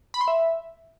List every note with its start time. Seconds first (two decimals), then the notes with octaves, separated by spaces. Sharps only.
0.14 B5
0.21 C6
0.28 E5